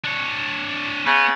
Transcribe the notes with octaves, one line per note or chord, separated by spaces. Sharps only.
D4 C#5
C#3 B3